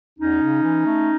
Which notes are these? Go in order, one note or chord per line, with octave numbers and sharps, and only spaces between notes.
E2 C#4 D#4
C#3
E3
A3